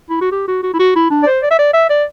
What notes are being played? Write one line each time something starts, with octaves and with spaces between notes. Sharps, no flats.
E4
F#4
G4
F#4
F#4
E4
F#4
E4
D4
D5
C5
D5
E5
D5
E5
D5